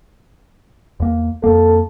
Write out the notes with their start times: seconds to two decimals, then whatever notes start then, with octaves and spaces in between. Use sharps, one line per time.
1.00 E2 A#3
1.44 F2 A#3 A4